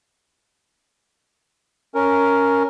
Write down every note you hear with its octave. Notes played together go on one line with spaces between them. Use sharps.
C#4 A#4